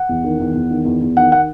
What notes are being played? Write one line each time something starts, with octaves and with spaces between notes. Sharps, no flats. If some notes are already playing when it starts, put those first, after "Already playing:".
Already playing: F#5
E2
D#3
E2
E2
D#3
E2
E2
D#3 F#5
F#5